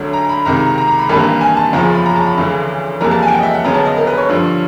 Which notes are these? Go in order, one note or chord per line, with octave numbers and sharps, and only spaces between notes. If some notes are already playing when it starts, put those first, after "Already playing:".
Already playing: D2 D3 F#3 A3
A#5
B5
C#2 C3 D#3 A#5
A#5
A#5
A#5
A#5
B5
G#1 G2 E3 G3 A#3 B5
A#5
G#5
A5
F#1 E2 C#3 F3 A#5
B5
A#5
A5
B5
D2 C#3 E3 A3
F2 C#3 E3 G3 A#3 A#5
A5
G#5
G5
F#5
D#5
E5
F#5
D2 C#3 F#3 B3 A#5
A5
D#5
A#4
B4
C#5
G2 D3 F3